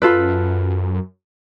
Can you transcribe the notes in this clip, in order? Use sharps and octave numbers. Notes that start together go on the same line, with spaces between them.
F#2 F4 A4 B4